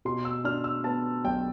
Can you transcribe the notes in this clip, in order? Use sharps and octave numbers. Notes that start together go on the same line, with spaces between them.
B2 C6
E6
D4 F6
E6
B3 A5
B1 G5